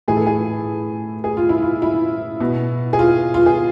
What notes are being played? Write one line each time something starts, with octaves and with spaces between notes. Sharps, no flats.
A2 E3 G#4
A4
G#4
G#4
F4
E4
F4
E4
B2
G#4
F4
F4
G#4